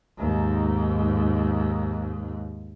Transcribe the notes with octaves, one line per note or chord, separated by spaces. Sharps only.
D#2 G#2